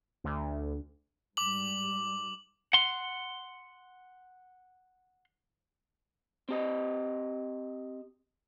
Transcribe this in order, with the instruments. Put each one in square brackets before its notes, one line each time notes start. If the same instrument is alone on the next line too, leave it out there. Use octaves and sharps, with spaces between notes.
[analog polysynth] D2
[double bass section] G#2 G3 [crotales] D6 F#7
[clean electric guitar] F#5 C6
C4 G4 D#5